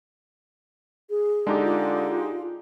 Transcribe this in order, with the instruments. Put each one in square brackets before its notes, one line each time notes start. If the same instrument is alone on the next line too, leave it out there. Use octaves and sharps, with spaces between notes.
[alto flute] G#4
[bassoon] D3 [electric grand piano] G#3 D#4 G4
[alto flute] F4